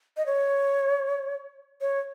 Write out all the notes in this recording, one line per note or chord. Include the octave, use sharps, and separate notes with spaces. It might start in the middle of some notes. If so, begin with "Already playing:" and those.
D#5
C#5
C#5